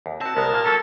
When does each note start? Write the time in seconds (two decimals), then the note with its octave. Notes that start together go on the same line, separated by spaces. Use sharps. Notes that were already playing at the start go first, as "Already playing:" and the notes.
0.06 D#2
0.21 C4 F#4 A5
0.36 C2 G#3 B3 A#4
0.53 A#2 A#3
0.65 F#3 A#3 C#4 A4